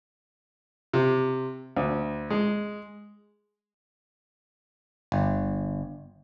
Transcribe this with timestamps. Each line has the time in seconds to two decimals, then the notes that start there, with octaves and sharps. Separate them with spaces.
0.93 C3
1.77 D2
2.30 G#3
5.12 G1